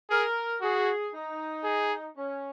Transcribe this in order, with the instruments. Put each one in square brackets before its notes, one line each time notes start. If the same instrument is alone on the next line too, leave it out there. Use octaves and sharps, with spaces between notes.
[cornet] G#4 [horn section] A#4
[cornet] F#4 [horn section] G#4
[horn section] D#4
[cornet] G#4
[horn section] C#4